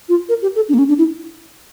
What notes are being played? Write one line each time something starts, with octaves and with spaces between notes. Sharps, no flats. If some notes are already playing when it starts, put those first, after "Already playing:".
F4
A#4
G4
A4
D4
A#3
C#4
D4
E4